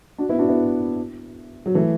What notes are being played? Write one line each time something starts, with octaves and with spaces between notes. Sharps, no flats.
D4 F#4
B3 E4
D4 F#4
B3 E4
F#3
E3 A3